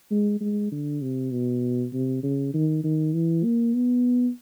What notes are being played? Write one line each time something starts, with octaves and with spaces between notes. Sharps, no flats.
G#3
G#3
D3
C3
B2
C3
C#3
D#3
D#3
E3
A#3
B3